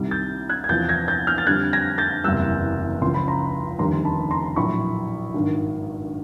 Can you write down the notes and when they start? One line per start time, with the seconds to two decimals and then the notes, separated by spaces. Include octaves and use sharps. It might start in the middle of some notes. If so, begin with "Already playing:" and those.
Already playing: C2 C3 D#3 G3
0.11 G6 A6
0.49 F#6 G#6
0.64 G#6
0.69 E2 C3 F3 G6 A6
0.89 G#6 A#6
1.08 G6 A6
1.27 F6 G6
1.38 A6
1.47 F2 D3 G3 F#6 G#6
1.73 G#6 A#6
1.98 G6 A6
2.24 F#1 E2 C3 E3 G3 E6 F#6
3.01 C#2 C#3 F3 C6
3.14 B5
3.28 A#5 C6
3.79 F1 D#2 D3 G3 A#5 C6
4.04 A5 B5
4.31 A#5 C6
4.56 A#1 A2 F#3 B5 C#6
5.34 G#1 G2 D#3